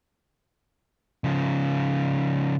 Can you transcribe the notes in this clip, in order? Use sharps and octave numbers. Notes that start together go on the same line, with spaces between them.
C#3 F3